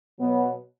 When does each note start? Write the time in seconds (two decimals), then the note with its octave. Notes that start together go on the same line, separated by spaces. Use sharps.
0.19 B2 F#3 B3